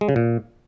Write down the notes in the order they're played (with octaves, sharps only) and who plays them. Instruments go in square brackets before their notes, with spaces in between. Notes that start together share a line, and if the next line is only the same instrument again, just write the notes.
[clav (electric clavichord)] G#3
C#3
A#2